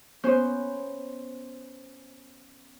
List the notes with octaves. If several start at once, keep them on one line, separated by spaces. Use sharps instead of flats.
B3 C#4 C5